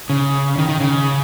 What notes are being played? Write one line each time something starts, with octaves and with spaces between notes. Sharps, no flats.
C#3
D#3
D#3
C#3